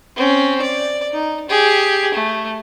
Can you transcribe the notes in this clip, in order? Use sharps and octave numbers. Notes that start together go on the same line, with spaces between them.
C4 C#4
D5
D#4
G4 G#4
A3